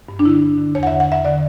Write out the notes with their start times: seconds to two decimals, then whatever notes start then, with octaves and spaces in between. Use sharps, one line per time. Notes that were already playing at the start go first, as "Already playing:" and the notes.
0.09 G2
0.19 D4
0.25 D3 E4
0.43 G2
0.58 D3
0.75 E2 C#5
0.83 F#5
0.87 E5
0.92 D3
1.00 F#5
1.08 E2 E5
1.25 D3 D5